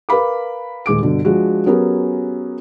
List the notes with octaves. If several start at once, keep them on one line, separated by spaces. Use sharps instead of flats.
A#4 B4 F5 B5 D6
D#1 G#3 D6 D7
G2 B2 D3
F3 G#3 D4 F#4
F#3 B3 C#4 G4 G#4 A#4